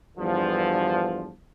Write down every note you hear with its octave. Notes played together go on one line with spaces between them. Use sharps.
E2 G2 D3 F3